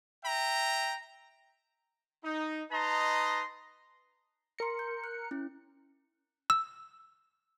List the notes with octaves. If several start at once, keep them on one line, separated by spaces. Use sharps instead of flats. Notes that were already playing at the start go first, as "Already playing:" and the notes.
E5 G5 A#5
D#4
D#4 B4 D#5 A5 A#5 C6
A#4 C6 A#6 C#7
G6
F#6
C#4 E4
E6